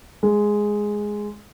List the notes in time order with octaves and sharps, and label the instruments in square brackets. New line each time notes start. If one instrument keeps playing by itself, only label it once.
[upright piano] G#3